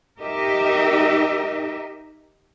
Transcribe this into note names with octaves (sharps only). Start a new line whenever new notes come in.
D#4 G4 A#4 D#5 E5